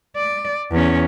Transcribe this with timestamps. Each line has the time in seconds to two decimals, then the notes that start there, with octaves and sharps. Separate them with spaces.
0.17 D5
0.71 E2 C#4